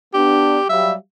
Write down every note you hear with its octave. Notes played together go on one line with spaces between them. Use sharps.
B3 D4 G4
F#3 G3 E5 F5